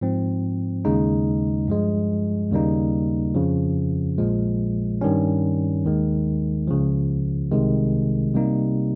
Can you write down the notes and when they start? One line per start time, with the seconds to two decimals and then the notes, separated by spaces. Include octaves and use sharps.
0.01 G#2 F3 C4
0.85 D#2 C#3 G#3 D#4
1.68 G2 F3 G#3
2.52 D#2 C#3 G3 A#3 D#4
3.35 F2 C#3 F3
4.18 A#1 A#2 F3 G#3
5.01 G2 D#3 G3 C#4
5.85 D#2 D#3 G#3
6.68 C#2 C#3 F3
7.51 C2 C3 D#3 G#3
8.34 C3 G3 A#3 D#4